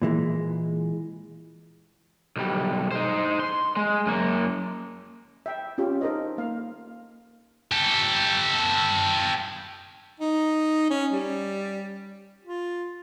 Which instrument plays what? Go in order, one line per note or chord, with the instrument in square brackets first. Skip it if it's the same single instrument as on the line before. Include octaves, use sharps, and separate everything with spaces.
[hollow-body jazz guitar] A#2 E3 G#3
[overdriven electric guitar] B1 G3
D#4 C5
C6
G#3
F#2 A#3
[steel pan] E5 G5
C#4 F4 G4
D#4 A4 A#4 C5 D#5
A#3 F5
[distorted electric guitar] G4 A4
[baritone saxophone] D#4
C#4
G3
F4